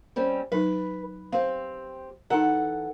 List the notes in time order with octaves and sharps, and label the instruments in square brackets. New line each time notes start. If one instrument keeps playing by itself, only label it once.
[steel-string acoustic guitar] G3 C4 C#4
[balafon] F#3 D#4 [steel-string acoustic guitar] B4
[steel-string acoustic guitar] C4 G4 [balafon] F5
[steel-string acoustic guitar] E3 A4 F#5 [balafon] D#4 A#5